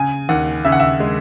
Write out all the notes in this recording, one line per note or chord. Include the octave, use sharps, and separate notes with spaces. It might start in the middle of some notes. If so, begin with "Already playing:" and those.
Already playing: C#3 G#5
D#2 F#5
C#3 E5
F#5
E5
G#3